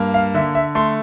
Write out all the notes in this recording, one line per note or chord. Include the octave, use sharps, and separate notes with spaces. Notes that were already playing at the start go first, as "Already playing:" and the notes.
Already playing: G2 A#3
F5
D3 E5
E5
A3 C6